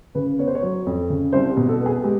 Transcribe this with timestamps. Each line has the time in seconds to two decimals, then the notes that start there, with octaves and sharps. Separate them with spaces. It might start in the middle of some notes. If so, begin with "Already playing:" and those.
0.15 C#3 B4
0.39 B3 C#5
0.47 C5
0.55 C#5
0.62 F#3
0.86 F2
1.09 C#3
1.32 C2 C5
1.51 G4
1.57 B2
1.68 A4
1.81 B3
1.86 G#4
2.04 G#3 G4